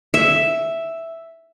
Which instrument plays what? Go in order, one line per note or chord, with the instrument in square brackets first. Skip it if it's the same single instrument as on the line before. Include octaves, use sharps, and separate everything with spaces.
[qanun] E5